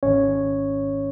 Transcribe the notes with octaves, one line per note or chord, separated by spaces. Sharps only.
G#1 G#2 D#3 C#4 C#5